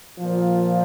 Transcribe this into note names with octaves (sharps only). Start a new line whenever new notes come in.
A#2 F3